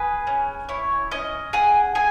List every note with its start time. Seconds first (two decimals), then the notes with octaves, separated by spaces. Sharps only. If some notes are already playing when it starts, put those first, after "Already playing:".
Already playing: G#4 B4
0.27 C#4
0.69 E4 C#5
1.11 C#4 D#5
1.53 G#4 F#5
1.95 G#4 G#5